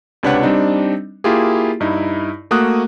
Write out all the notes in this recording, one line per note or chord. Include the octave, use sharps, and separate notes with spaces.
C#2 C3 D4 B4 C#5 F#5
G3 C4 D4 D#4
A#3 E4 F4 G4 G#4
G2 D#4 E4
A3 A#3 F#4 D#6 F#6